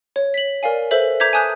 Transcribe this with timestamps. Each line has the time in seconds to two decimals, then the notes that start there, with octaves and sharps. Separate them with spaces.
0.16 C#5
0.34 B6 F#7
0.63 A#4 D5 F5 G#5
0.91 A4 B4 C5 E5 F#7
1.20 A#5 D6 G6 G#6 B6
1.33 G#5 A5 D#6 F#6 G6